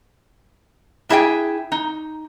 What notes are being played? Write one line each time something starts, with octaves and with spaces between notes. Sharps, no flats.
D4 E4 G#4 E5 G5
D#4